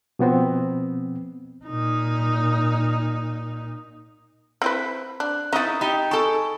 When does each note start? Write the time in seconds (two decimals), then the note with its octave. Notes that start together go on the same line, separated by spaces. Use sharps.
0.19 B2 F3 B3 C4
1.65 A#2 D#4
4.62 C4 E4 B4
5.20 D4 F#6
5.53 C#4 D#4 E4 D#5 A#5 D#6 A6
5.81 D#4 G4 A#5 B5
6.11 A4 G#5 A5 C#6